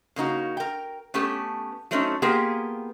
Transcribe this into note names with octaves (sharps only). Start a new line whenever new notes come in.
C#3 A#3 D#4 F#4
A#4 G5
A3 B3 C#4 G4 A4
F#3 A3 C4 C#4 D#4
A#3 B3 F4 G4 G#4 A#4